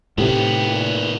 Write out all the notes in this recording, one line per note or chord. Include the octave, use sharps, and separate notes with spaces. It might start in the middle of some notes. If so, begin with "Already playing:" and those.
A2 C3 D#3 B3 G4
A#2